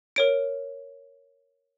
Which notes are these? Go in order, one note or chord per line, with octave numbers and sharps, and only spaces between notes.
A#4 C#5 D7